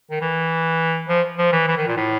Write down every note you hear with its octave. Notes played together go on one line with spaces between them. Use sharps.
D#3
E3
F3
F3
E3
E3
D#3
A#2
A2